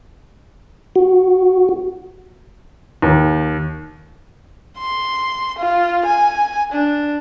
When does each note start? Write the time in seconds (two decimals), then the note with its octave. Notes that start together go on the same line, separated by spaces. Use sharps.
0.96 F#4
3.02 D#2
4.78 C6
5.58 F4
6.06 G#5
6.72 D4